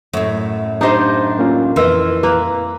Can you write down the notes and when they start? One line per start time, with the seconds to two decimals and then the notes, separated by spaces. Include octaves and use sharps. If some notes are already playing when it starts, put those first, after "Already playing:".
0.14 F#2 A2 A3
0.81 D4 D#4 G4 C5 D#5 F5
1.39 A#3 C#4 F4
1.76 F2 E3 E4 A#4 D#5 C6 E6
2.23 A#3 B4